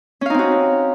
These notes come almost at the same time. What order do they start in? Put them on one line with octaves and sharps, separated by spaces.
C#4 F5 D#4 C4 F#4